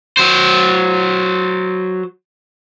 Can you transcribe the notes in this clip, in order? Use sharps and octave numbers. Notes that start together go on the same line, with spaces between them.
F#3 C5